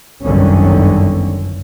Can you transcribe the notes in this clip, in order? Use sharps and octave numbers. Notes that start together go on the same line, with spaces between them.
G1 C2 F#2 D3 D#3 C#4